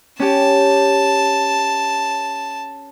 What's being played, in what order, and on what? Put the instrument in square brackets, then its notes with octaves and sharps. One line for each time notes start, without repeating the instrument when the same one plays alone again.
[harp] C#4 G4 [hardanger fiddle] A5